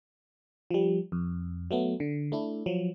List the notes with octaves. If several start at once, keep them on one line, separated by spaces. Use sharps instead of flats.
F3 G3
F2
F#3 A3 B3
D3
A3 D4 E4
F3 F#3